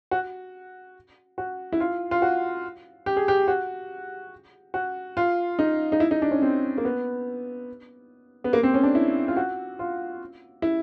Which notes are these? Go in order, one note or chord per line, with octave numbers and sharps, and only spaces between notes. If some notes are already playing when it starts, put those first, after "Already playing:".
F#4
F#4
E4
F4
F4
F#4
G4
G#4
G4
F#4
F#4
F4
D#4
D#4
E4
D#4
D4
C#4
C4
A#3
B3
B3
A#3
C4
C#4
D4
E4
F4
F#4
F4
E4